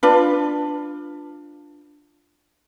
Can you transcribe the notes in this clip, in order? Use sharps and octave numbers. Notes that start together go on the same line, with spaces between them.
D4 F4 B4